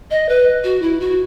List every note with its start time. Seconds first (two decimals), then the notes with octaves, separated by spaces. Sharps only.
0.10 D#5
0.28 B4
0.63 F#4
0.82 E4
1.00 F#4